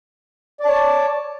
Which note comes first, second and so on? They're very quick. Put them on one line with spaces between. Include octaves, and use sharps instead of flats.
D5 D6 A5 C#5